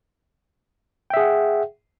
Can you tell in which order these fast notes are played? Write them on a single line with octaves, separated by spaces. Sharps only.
G5 E5 G#4 F#5